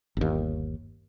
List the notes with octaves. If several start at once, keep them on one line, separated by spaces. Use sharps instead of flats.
G1 D#2